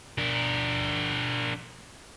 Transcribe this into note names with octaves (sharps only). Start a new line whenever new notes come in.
D4 A#4